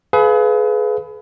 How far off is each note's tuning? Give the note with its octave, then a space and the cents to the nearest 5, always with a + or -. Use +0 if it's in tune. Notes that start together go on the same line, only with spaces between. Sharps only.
G#4 +35 B4 +15 F5 +0